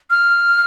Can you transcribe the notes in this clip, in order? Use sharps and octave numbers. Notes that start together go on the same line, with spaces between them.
F6